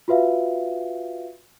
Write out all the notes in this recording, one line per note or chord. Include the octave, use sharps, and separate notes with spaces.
F4 F#4 B4 E5 F5